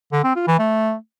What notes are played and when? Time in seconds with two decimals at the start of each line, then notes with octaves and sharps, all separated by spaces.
0.12 D3
0.24 C4
0.36 F4
0.47 E3
0.59 A3